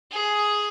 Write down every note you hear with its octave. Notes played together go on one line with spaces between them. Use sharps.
G#4